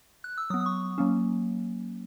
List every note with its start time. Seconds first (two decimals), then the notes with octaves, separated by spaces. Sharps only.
0.24 F#6
0.38 E6
0.50 F#3 D#6
0.54 B3
0.60 D#6
0.66 C#6
0.98 F#3 A#3 C#4